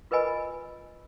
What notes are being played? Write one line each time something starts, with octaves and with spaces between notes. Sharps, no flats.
F4 A#4 B4 D#5 G#5 B5